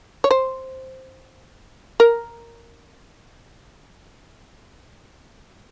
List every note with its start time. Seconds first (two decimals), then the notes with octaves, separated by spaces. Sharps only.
0.24 C#5
0.31 C5
2.00 A#4